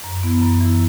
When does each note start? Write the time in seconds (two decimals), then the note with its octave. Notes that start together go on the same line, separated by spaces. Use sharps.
0.04 F#2
0.23 E3 B3 E4
0.42 F#2
0.60 E3 B3 E4